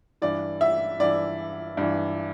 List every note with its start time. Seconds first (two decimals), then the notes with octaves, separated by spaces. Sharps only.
0.22 G2 E3 D5
0.61 E5
1.00 G2 E3 D5
1.77 G2 E3